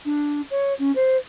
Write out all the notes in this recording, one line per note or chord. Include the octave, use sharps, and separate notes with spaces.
D4
C#5
C#4
C5